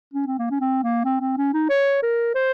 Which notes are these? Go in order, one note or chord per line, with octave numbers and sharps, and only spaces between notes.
C#4
C4
A#3
C#4
C4
A#3
C4
C4
C#4
D#4
C#5
A#4
C5